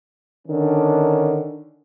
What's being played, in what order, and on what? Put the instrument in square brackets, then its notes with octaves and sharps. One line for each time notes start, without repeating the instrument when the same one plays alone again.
[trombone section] D3 D#3 C#4 D4